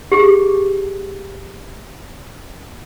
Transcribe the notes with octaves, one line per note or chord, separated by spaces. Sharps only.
G4 G#4